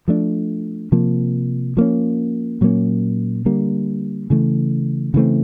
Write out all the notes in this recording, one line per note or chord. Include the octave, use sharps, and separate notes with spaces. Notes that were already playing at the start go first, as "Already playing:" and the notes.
F3 A3 D4
C3 F3 A#3
F3 A#3 C#4
A#2 F#3 A#3 C#4
D3 G3 A#3
C#3 E3 A3
C#3 E3 A3 C4